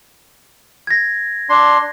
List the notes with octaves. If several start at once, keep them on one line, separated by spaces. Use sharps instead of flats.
G#6 A#6
D4 C6